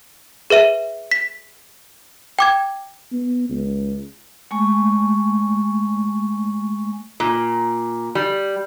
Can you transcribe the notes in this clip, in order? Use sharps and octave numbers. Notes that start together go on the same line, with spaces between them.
G#4 B4 E5 D#7
B6
G5 D6 G#6
B3
C#2
G#3 A3 G#5 C#6
A#2
G3